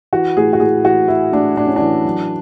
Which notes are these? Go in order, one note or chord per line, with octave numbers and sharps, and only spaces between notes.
E3 F#4
A2 G#4
F#4
A2 G#4
E3 F#4
E3 E4
A2 D4
A2 D4
C#4
E3 D4
F#3